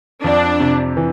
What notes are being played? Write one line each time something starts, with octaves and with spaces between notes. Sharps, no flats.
F2 D4
C3
E3